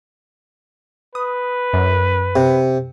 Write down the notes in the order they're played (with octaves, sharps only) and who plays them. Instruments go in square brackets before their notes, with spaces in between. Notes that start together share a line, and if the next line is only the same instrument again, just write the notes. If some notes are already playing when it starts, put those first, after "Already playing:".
[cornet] B4 [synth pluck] D#6
[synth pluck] F#2
[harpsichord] C3